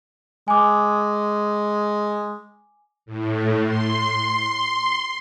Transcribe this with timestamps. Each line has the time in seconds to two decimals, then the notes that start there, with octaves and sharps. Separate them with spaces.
0.48 G#3 G#5 D6
3.06 A2
3.64 C6